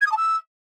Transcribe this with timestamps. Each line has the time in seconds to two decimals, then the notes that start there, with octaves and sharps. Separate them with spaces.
0.01 G#6
0.07 D#6
0.12 A5
0.17 E6